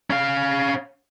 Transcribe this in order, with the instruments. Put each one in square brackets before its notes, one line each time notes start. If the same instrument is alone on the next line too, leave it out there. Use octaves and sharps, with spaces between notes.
[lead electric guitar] C#4 F5